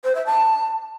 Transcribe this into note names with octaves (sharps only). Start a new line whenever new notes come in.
C5
E5
A5